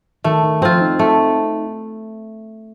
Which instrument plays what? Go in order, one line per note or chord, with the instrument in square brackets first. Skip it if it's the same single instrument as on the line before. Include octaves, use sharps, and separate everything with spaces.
[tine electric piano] D#3 [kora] A3
[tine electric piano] D#3
[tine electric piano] F3 [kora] C4 F4
[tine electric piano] D#4
[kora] A3